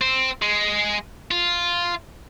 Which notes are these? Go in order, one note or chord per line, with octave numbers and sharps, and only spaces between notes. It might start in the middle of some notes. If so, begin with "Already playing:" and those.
C4
G#3
F4